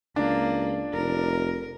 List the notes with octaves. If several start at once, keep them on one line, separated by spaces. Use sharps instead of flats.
C#2 A#3 D4
F1 A#4